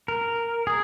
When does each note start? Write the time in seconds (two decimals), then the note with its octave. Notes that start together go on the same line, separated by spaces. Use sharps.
0.08 A#4
0.67 G#4